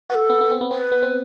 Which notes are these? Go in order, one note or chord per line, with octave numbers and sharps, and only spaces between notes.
F#4 B4
A4
B3
B3
C4
B3
C4 B4
B3
C4